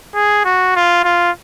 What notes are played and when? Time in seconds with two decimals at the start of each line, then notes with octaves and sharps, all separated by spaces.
0.15 G#4
0.45 F#4
0.76 F4
1.04 F4